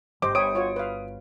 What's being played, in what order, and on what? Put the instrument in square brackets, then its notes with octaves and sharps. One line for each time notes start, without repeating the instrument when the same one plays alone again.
[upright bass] G1 [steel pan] G4 C5 D#5 [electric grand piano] D6
[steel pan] C#5 G5 B5 [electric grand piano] D#6 D7
[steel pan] F4 F#4 C#5
B4 F5